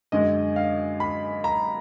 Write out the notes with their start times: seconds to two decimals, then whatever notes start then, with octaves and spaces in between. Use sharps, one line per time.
0.12 F#2 D3 G#3 D#5
0.56 F5
1.00 B5
1.44 A#5